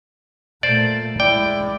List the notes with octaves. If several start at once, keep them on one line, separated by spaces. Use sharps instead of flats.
A#2 A3 C5 D5
G#3 E4 D5 G5